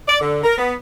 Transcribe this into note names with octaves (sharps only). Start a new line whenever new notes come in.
D5
D3
A#4
B3